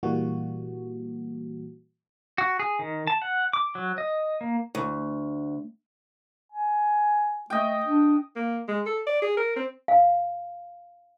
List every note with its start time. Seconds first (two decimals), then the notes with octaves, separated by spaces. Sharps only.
0.03 A#2 E3 G3 A#3 F#4
2.38 F#4
2.60 G#4
2.79 D#3
3.07 A5
3.22 F#5
3.53 D6
3.75 F#3
3.98 D#5
4.41 A#3
4.75 D2
6.52 G#5
7.50 A3 D#5 G5
7.85 D4
8.36 A#3
8.68 G#3
8.86 A4
9.07 D5
9.22 G#4
9.37 A#4
9.56 C4
9.88 F5